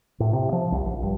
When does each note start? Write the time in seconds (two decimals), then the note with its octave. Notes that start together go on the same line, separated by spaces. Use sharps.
0.20 A2
0.33 C3
0.52 F3
0.72 C2
0.86 A#1
1.03 G2